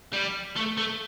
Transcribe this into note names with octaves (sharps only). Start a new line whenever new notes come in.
G3
A3
A3